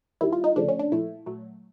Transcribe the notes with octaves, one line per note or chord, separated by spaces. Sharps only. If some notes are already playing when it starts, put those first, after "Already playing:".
D#2 D#3 G3 E4
F4
D#4
D2 C#3 F3 A3 D4
C#4
D4
A#2 F3 A3 E4
A#2 F#3 A3